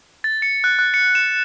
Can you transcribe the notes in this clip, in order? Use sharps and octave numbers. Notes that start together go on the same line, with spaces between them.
A6
C#7
F#6
F#6
C#7
E7